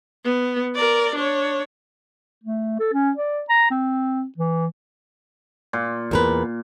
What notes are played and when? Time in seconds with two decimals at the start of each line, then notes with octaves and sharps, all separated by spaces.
0.24 B3
0.75 A#4 D5
1.15 D4 C#5
2.44 A3
2.79 A4
2.93 C#4
3.17 D5
3.49 A#5
3.71 C4
4.38 E3
5.73 A#2
6.11 E2 A#4 B4